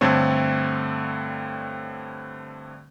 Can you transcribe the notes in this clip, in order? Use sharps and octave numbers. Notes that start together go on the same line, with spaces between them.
G2 D3 A3 C4 C#5